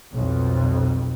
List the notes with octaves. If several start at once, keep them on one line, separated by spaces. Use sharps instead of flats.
B1 F2